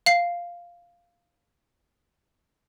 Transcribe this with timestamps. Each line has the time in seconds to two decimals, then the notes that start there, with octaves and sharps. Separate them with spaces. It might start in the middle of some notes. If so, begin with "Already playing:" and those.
0.06 F5 C7